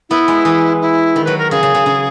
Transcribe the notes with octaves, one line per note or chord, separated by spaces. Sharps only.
B3 E4
G#3
E3
E4
D#3
F#3 B4
A#4
C#3 G#4
C#3
C#3
C#3